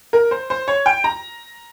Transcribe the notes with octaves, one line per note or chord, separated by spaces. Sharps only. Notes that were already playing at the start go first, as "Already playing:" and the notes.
A#4
C5
C5
C#5
G5
A#5